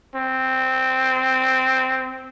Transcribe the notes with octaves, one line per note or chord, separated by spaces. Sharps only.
C4